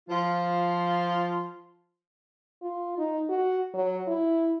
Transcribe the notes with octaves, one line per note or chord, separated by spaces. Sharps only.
F3 F4
F4
D#4
F#4
F#3
E4